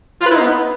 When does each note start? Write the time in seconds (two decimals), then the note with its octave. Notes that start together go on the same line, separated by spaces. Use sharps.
0.20 F4
0.25 B4
0.30 E4
0.35 D#4
0.40 B3